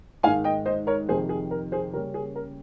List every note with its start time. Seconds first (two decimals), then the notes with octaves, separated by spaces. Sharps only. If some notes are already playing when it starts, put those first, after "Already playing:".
0.23 G#2 D#3 G#3 F5 G#5
0.44 D#5 G5
0.66 C5 D#5
0.87 A#4 C#5
1.08 F2 C3 D#3 G#4 C5
1.29 G#4
1.51 A#4
1.72 G#4 C5
1.93 C#3 G3 A#3 C#4 A#4
2.14 G#4
2.36 A#4